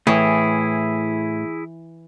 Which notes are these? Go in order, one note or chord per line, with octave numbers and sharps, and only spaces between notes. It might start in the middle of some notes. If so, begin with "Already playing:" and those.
A2 E3 E4 G#4